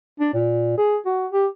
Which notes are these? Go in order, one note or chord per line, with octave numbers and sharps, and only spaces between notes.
D4
A#2
G#4
F#4
G4